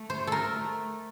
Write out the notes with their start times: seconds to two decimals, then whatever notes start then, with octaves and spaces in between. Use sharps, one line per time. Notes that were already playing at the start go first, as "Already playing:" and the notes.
Already playing: A3
0.10 C5
0.27 A4 A#4
0.54 A3